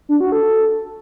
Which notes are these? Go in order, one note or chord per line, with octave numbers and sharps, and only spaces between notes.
D4
F#4
A4